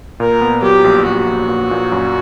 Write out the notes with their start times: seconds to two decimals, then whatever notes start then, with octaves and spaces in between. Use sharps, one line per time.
0.20 A#2 A#4
0.41 B3
0.62 F#3 G4
0.84 A#1
1.05 A#1 F#4
1.28 A#1
1.48 A#2
1.71 A#2
1.92 F#2